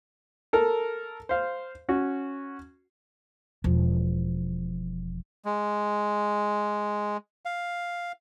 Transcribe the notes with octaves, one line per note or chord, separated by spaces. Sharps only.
A4 A#4
C5 F5
C#4 F#4
E1 F3
G#3
F5